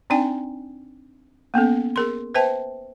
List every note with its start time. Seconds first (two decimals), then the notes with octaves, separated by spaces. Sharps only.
0.10 C4 D4 D#4 D5 G5 G#5
1.54 A#3 B3 C#4 A4
1.96 G#4 A#4 C6
2.35 B4 C5 E5 G5 A5